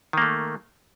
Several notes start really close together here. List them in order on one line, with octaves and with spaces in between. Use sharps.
D#3 A#3 A3